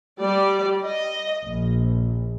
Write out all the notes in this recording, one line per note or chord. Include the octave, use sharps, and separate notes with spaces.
G3 D5
D#5
A#1